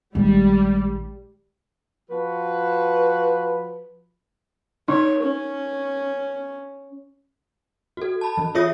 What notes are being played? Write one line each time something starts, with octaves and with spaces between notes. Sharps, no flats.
A1 A#2 D#3 G3 G#3
F3 F#4 B4
D#4 C#5
C#4
F#4 A4
A5 B5
E3
F4 G#4 C#5 E5 D#6 A#6